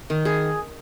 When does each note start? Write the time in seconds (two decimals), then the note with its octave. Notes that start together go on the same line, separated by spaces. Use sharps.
0.10 D#3
0.25 G#4